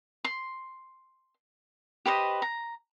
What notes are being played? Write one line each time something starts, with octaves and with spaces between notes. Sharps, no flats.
C6
G4 B4 C5 D#5
A#5